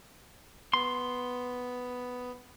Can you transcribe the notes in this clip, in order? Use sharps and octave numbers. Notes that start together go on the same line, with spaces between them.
B3 C6